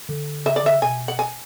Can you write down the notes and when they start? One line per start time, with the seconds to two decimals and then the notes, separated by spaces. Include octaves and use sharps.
0.09 D3
0.45 C#3 E5
0.56 D5
0.63 D3 E5
0.73 C#3
0.82 B2 G#5
1.08 F#5
1.19 G#5